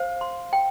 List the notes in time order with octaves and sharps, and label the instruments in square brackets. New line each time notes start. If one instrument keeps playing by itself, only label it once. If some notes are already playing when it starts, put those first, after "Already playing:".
Already playing: [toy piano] C5 [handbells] F5
[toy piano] C6
G5